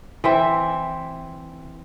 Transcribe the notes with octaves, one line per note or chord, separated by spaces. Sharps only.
E3 C4 E5